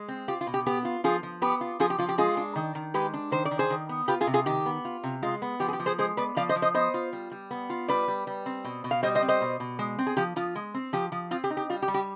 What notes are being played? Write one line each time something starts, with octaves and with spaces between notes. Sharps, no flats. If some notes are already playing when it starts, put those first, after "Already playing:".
Already playing: G#3
C4
F4 G4
F4
B2
G4
B3 G4
F4
F3 F4 G#4
F3
B3 G4 B4
F4
F3 F4 G#4
G4
F3 F4
G4
G#3 F4 G#4
D4
D#3
D#3
G#3 G4 B4
D4
D#3 C5
D5
D#3
G#4 C5
D#3
B3
F4 G4 B4
F4 G#4
C3
F4 G#4
D#3 G4
B3
F4
C3
G#3 F4
B3
F3 G4
G#4
G4
F3
G#4 C5
G#3 G#4 C5
B3 B4 D5
F3 D5 F5
C5 D#5
F3
C5 D#5
B3 C5 D#5
F4
G3
G3
B3
F4
G3 B4 D5
G3
G3
C4
B2
B2
F5
G3 C5 D#5
C5 D#5
C4
C5 D#5
B2
B2
G#3
C4
G#4
F3 G4
F3 F4
G#3
C4
F3 G4
F3
C4 F4
G4
D#4
G4
G3 F4
G4
G3
G4